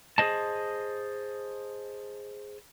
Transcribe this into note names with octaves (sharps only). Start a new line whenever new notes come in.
G#4 A4 C5 D#5 A5